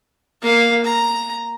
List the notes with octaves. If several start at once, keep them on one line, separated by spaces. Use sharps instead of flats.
A#3 F5
A#5